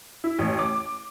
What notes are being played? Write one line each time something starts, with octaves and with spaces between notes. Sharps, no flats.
E4
A1
D6